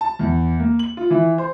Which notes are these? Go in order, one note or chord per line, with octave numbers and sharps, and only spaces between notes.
A5
E2
A#3
F#7
F4
E3
C5